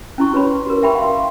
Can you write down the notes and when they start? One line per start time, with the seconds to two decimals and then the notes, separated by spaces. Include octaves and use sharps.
0.18 C#4 E4 C#6
0.33 F#4 B4 C#5 B5
0.66 F#4 A#4
0.83 E5 G5 B5 C#6
0.95 F5 F#5 B5 C6